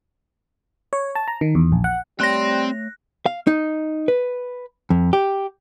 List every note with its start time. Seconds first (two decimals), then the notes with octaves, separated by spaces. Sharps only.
0.93 C#5
1.15 A5
1.28 A#5
1.41 D#3
1.55 E2
1.72 A#1
1.84 F#5
2.20 G3 A3 C4 C#5 C6 F#6 A#6
3.26 F5
3.47 D#4
4.08 B4
4.90 F2
5.13 G4